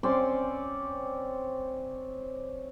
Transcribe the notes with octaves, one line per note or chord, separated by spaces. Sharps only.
C4 C#4 D5 C6